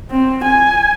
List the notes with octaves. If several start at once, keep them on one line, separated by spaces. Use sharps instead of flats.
C4
G#5